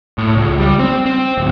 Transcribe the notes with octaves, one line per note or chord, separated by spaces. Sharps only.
A2
C#2
G3
C4
C4
D1